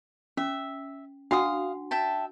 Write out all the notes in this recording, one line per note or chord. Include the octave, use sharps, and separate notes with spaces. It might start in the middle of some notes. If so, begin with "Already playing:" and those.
C#4 E5
D4 F#4 F5 F#5 D#6
E5 G5 A5